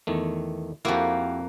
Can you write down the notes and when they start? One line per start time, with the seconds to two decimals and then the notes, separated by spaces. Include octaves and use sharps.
0.07 E2 D#3 A3
0.85 F2 A#3 E4 F#4 G4